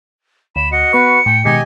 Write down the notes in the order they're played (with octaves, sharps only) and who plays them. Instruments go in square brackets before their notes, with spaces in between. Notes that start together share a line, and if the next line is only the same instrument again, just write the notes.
[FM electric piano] D2 [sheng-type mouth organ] B5 [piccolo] E7
[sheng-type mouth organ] F#4 D#5 [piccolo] C#7
[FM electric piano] B3 C#6 [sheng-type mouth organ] F#4 B4
[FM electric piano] A2 [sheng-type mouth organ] G5
[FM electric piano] B2 D#3 G#3 [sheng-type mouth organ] G4 D#5 G#5